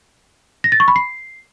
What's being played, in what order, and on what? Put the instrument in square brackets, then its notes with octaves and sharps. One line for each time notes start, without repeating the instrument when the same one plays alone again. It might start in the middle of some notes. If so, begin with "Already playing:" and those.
[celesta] A#6
A6
C#6
B5
C7